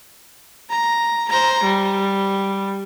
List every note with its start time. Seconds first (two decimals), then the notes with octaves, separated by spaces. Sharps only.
0.70 A#5
1.29 C5 A#5
1.64 G3